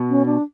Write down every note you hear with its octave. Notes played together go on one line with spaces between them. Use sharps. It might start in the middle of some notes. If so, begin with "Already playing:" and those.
Already playing: B2
C#4
D4